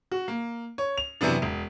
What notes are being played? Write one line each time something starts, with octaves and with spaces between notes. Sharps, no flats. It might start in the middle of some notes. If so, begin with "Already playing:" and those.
F#4
A#3
C#5
F7
F#2 C3 E3 B3 D4
E1